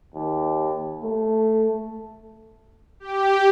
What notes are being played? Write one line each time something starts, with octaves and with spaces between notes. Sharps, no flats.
D#2
A3
G4